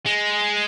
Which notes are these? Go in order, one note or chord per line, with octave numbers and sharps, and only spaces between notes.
G#3